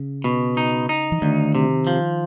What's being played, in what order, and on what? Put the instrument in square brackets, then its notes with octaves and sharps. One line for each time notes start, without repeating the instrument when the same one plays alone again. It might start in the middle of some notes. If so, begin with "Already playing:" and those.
Already playing: [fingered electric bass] C#3
[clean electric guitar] B2
D#4
D#4
[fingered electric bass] E3
[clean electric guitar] D2 [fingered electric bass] D#3
[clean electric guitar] C3
F3